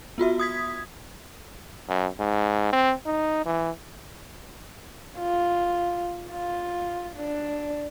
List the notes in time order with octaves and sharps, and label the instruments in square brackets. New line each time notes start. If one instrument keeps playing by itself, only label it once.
[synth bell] B3 F4 F#4 E5
D#6 G#6 B6
[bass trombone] F#2
G#2
C4
D#4
E3
[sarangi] F4
F4
D4